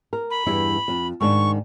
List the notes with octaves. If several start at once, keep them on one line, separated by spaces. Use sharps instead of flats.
A#4
B5
E2 G2 E4
F2
G#2 D#3 D4 C#6